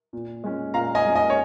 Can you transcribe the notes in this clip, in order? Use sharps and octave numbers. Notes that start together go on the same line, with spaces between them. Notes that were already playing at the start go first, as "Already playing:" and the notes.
A#2
G#3 C#4
A#2 F5 A#5
D#5 G#5
G#3 C#4
D#5 G#5
C#5